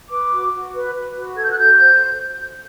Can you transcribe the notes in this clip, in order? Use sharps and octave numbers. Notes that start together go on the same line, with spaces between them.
B4 D6
F#4
F#4
B4
B4
F#4
A4 G#6
G6
F#6
F#4 G6
C5